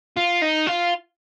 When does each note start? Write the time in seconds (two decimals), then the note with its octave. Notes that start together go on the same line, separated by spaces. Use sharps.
0.17 F4
0.42 D#4
0.67 F4